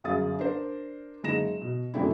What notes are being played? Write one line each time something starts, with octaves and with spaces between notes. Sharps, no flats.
G1 F#2 G#4 F5 D#6 A6
D4 A#4 C5
F#1 G#3 D#4 A#6 E7
B2
F#2 C3 A3 C4 D4 E4